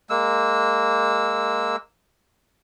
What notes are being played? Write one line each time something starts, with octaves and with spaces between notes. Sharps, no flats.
G#3 A#3 E6